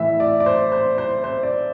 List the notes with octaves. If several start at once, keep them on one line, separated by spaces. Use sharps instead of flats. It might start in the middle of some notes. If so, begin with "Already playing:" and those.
Already playing: A2 E3 E5
D5
D5
C5
C5
C5
C5
D5